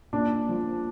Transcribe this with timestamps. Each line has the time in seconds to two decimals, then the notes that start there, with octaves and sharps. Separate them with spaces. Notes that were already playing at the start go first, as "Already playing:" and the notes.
0.13 A#2 D4
0.49 F3